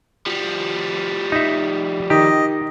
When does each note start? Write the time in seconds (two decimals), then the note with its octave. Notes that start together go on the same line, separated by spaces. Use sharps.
0.27 F3 G3
1.32 D#4 E5
2.10 D#3 G4 D#5